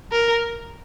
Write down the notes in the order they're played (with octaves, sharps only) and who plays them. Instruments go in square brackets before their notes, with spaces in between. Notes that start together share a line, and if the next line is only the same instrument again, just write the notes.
[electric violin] A#4